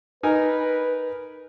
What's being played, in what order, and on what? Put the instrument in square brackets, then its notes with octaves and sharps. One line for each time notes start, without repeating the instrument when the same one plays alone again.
[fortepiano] D#4 A#4 G#5 [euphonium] B4